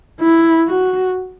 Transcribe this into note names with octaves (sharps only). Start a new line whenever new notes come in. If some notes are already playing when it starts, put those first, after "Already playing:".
E4
F#4